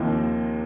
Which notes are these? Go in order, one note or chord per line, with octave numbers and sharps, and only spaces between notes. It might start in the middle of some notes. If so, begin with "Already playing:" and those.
Already playing: D#2 C3 D#3 F3 A#3 D#4